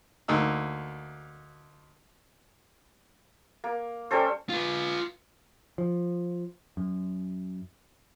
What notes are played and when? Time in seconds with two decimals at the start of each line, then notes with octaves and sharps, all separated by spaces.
0.28 D2 A#3 D#4 E6
3.64 A#3
4.11 G3 C#4 A4 C5
4.49 F4 B4
5.78 F3
6.77 F#2